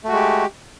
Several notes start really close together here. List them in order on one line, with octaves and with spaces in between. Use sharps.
A3 F#4 G#3 G4